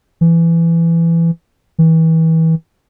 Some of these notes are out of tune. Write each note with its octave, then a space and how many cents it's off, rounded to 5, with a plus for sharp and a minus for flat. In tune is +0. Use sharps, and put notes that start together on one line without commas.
E3 +20
E3 -30